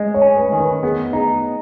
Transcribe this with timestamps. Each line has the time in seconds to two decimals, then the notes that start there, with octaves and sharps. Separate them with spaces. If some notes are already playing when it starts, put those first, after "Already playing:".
Already playing: G#3 D#5
0.14 C#5
0.22 C#4
0.37 B4
0.52 D#3
0.60 B4
0.83 B3 G#4
1.13 D#4 G#4